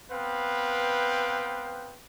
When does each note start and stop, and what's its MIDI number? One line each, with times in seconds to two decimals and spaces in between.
0.11 1.98 59
0.11 1.98 60
0.11 1.98 71
0.11 1.98 77
0.11 1.98 79